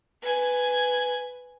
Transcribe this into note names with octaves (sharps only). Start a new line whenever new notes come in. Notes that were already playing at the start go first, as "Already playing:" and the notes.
B4 G#5